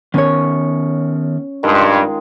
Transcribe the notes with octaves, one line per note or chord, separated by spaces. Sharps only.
D#3 B3 C#4 A#4 C#5
G2 D#3 G#3 F4